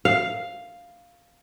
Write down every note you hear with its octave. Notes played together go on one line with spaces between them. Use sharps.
F5